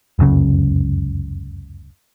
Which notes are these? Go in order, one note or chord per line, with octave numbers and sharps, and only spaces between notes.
F1 C#2 F#2 C#3